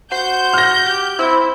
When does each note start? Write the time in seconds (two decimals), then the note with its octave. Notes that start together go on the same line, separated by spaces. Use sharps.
0.12 F#4 C5 G6
0.54 F6 A#6
0.86 G4
1.19 C4 E4